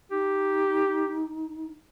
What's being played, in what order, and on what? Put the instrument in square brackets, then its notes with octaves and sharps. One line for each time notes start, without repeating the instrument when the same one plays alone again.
[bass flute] D#4 [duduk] G4